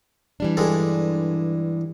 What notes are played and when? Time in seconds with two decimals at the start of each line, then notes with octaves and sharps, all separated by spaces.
0.40 E3 G3 D4
0.57 G2 D3 G#3